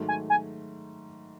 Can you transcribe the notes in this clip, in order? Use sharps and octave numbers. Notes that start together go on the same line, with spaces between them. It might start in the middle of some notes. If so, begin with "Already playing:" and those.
Already playing: G#2 D#3 F#3 A3
G#5
G#5